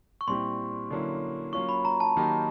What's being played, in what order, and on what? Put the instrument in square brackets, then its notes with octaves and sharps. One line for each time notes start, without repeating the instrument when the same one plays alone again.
[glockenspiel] C#6
[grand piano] A#2 G3 C4 E4 G4 [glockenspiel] C6
[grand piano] D3 F#3 A#3 C#4 E4
[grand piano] F#3 A#3 C#4 F4 [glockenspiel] C#6
[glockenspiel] B5
A#5
A5
[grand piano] D#3 F#3 A#3 D#4 G4